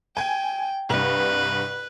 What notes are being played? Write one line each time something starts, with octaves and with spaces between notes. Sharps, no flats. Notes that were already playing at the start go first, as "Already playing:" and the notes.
G5 G#5 G#6
C2 G2 B4